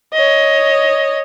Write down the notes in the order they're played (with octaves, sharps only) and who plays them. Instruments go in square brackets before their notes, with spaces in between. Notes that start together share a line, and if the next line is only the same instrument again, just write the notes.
[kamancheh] C#5 D#5